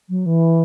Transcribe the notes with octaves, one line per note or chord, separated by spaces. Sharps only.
F#3
E3